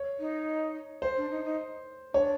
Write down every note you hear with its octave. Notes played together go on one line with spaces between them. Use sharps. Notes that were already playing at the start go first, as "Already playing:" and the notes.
Already playing: C#5
D#4
C5
D4
D#4
D#4
D4 C#5